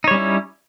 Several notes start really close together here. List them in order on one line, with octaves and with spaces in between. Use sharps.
D#4 C#5 G3 C#4 E4